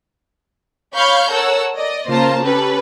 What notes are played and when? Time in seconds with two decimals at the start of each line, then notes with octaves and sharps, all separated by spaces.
0.96 C#5 F5 B5 C#6 F6 G6
1.31 A4 A#4 C#5 F#5 E6
1.75 D5 D#5
2.08 C#3 A#3 F4 C5 A5 A#5
2.43 C#4 G4 A4 B4